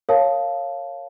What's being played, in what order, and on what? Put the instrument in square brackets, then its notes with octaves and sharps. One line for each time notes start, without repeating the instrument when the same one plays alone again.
[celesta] A#4 C#5 F5 A5